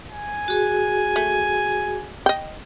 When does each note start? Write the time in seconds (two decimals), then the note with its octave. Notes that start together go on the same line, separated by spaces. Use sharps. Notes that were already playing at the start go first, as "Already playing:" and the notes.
0.10 G#5
0.48 F#4 G#4
1.16 A3
2.26 D#5 G5